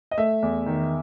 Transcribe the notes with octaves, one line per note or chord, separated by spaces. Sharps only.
D#5
A3 E5
E2
D#3